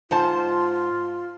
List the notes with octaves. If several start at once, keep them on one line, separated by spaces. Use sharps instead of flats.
G#2 F4 C5 A5